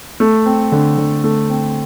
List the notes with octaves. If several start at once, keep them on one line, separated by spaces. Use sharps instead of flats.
A3
C4
D3
D3
A3
C4